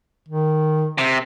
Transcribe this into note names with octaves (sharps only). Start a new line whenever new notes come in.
D#3
C3